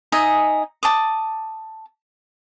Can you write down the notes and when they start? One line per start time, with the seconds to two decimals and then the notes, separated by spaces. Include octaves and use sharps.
0.12 D#4 D#5 E5 G#5
0.83 A5 D6 D#6